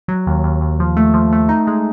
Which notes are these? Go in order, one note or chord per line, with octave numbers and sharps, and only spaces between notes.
F#3
D#2
D#2
D#2
F3
A3
F3
A3
D#4
G#3